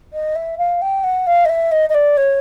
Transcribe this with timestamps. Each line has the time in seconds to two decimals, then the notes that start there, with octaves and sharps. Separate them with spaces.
0.13 D#5
0.36 E5
0.58 F5
0.82 G5
1.04 F#5
1.27 F5
1.45 D#5
1.49 E5
1.72 D#5
1.90 D#5
1.94 D5
2.17 C#5